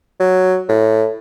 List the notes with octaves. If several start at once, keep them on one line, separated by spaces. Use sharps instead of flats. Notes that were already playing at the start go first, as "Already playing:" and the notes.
F#3
A2